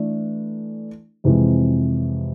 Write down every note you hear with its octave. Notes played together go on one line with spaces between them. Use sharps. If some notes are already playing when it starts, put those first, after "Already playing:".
Already playing: E3 A3 D4
F2 C3 E3 G#3